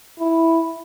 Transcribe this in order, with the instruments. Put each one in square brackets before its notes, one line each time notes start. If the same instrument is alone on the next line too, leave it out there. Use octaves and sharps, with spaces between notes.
[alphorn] E4